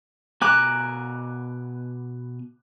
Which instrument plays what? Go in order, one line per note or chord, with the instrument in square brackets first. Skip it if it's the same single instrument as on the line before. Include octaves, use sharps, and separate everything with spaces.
[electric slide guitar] B2 G#5 A#5 [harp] D6 F#6